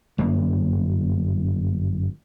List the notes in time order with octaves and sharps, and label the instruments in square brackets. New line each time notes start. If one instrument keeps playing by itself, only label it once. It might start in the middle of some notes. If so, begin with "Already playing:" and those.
[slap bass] G1 F#2 A#3